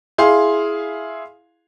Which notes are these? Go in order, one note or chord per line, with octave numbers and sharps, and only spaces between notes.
E4 G#4 F5 C6